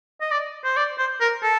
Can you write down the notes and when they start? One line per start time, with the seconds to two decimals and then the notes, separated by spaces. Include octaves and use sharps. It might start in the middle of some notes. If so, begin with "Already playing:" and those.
0.21 D#5
0.31 D5
0.65 C5
0.77 D5
0.99 C5
1.21 A#4
1.43 A4